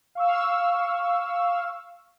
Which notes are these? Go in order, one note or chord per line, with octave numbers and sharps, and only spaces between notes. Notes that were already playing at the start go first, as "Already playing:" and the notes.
F5 C#6 E6